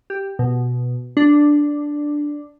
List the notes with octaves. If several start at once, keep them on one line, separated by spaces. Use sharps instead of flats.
G4
B2
D4